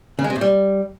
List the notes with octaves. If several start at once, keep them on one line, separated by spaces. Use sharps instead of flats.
C#3
G#3
C3
A2
G3